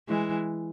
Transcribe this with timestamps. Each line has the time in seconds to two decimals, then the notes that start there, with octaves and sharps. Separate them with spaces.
0.08 E3 G#3